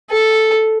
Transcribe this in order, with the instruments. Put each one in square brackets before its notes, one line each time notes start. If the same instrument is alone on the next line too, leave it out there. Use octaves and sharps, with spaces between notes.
[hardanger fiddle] A4